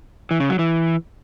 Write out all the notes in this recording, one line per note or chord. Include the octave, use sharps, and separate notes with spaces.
E3
C#3
F#3
E3